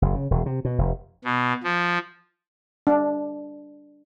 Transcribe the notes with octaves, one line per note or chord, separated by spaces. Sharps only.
F#1
C#3
E1
C3
B2
F1
B2
F3
D4